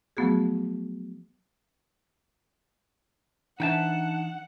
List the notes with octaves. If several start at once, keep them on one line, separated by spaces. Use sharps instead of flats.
F3 F#3 A3 B3 F#4 G#4
E3 D4 D#4 E5 F#5 G5 A5